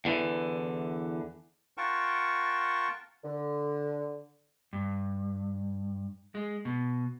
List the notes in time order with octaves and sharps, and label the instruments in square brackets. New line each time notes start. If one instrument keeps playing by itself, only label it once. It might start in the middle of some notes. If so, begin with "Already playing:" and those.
[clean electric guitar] E2 D3 E3
[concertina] F4 A#4 F#5 G5 A5 C#6
[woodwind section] D3
[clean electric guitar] G2
G#3
B2